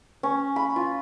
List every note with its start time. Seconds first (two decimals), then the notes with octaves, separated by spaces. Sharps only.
0.23 C#4
0.56 B5
0.76 F4